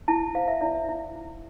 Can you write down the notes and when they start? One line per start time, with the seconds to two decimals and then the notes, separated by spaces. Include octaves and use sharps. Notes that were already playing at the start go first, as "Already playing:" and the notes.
0.08 E4 A5
0.35 C5 F5
0.48 E5
0.61 E4 D5
0.75 E5
0.89 E4
1.16 E4